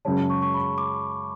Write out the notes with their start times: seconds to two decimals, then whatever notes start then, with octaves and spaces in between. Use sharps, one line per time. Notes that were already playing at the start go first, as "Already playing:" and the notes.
0.05 F#2 C#3 G#3 C#4 A5
0.30 C#6
0.42 C#6
0.54 B5
0.78 D6